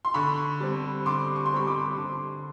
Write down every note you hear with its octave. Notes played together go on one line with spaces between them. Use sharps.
C6
D3 B5 C#6
G3 C4
D3 C6 D6
C#6
C6
G3 C4 B5 C#6
C6 D6
D3